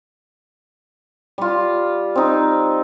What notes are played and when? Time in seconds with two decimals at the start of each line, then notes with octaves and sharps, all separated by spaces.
1.38 G3 F4
2.15 C4 D#4